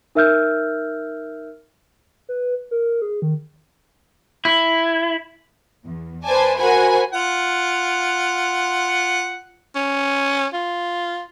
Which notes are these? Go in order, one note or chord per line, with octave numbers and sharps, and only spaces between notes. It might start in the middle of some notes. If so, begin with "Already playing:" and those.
D#4 A#4 E5 E6 F6 G6
B4
A#4
G#4
D#3
E4
E2
B4 C5 D5 G#5 A5
F#4 A#4 C5 F#5 G#5 B5
F4 F#5
C#4
F4